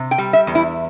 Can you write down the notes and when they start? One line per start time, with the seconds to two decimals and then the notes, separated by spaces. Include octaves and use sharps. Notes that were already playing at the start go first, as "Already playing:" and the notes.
Already playing: C3
0.11 G5
0.18 G3
0.33 E5
0.47 E2
0.55 E4